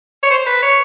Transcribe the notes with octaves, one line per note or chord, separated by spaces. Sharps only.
C#5
C5
B4
C#5